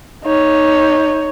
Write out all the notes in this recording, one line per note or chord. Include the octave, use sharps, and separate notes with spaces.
D#4 C#5